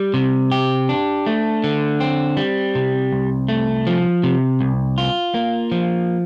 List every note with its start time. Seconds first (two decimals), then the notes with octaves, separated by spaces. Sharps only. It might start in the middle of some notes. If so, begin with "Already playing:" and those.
Already playing: G3
0.14 C3
0.52 G4
0.89 D4
1.26 A3
1.64 D3
2.00 C4
2.37 G3
2.75 C3
3.12 C2
3.48 A3
3.87 F3
4.23 C3
4.61 C2
4.98 F4
5.34 A#3
5.72 F3